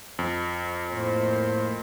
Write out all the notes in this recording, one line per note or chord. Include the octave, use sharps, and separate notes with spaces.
F2
A2 A#3 C5